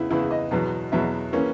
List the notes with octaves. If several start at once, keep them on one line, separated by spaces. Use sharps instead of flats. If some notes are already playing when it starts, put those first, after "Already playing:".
Already playing: E2 C#3 E3 E4
E2 C#3 E3 E4
D#5
E2 B2 F#3
E2 B2 F#3 E5
E3 A#3 C#4